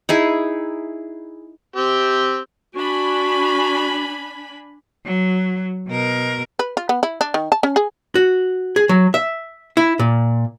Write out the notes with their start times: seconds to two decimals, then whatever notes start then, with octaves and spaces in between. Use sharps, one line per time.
0.09 D#4 E4 G#4
1.76 C4 G4
2.75 D4 F#4 G#5 B5
5.06 F#3
5.88 B2 A#4
6.59 B4
6.77 F4
6.89 B3
7.03 E4
7.21 D4
7.34 D#3
7.52 A5
7.63 C#4
7.76 G#4
8.15 F#4
8.76 G#4
8.89 F#3
9.14 E5
9.77 E4
9.99 A#2